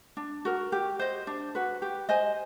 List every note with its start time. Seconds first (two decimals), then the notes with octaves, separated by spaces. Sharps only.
0.17 D4
0.45 F#4 A#4
0.72 G4
0.99 C5 D#5
1.27 D4
1.55 F#4 B4
1.82 G4
2.09 C5 D#5 G#5